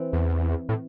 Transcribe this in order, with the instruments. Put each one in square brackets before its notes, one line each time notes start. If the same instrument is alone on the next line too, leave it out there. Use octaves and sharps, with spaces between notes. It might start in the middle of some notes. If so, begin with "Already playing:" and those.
Already playing: [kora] E3 C4
[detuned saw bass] E2
A2